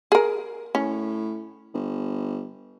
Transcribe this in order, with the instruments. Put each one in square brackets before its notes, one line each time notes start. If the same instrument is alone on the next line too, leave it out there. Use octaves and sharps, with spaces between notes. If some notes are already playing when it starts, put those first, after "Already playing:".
[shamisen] G#4 A#4
[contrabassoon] A2 [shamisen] C#4
[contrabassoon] G1